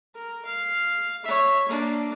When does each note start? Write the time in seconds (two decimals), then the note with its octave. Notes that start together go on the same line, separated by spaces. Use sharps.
0.15 A#4
0.45 F5
1.24 C#5 E5
1.68 A#3 D4